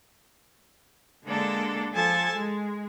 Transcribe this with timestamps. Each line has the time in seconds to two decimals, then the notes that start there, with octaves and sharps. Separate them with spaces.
1.25 D3 G#3 A#3 D4 A4
1.93 F3 A4 G#5 A5
2.35 G#3